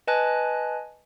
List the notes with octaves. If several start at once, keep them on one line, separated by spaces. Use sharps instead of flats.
B4 D#5 G#5 A5 F#6